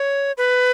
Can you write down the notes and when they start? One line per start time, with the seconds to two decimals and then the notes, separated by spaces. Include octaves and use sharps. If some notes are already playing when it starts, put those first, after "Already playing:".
Already playing: C#5
0.37 B4